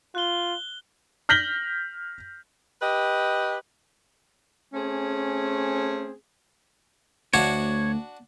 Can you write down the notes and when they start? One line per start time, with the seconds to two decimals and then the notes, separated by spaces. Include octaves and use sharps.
0.15 F4 F#6 G7
1.29 F6 G6 A#6 B6 F#7 G7
2.81 G4 B4 D#5
4.73 A3 C4 C#4 G#4
7.34 D2 D4 F#4 C#5 F5